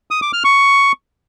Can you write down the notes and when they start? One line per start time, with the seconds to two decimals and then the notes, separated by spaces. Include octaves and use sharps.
0.11 D#6
0.22 D6
0.33 F6
0.44 C#6